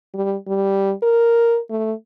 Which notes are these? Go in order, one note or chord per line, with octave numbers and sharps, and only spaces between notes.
G3
G3
A#4
A3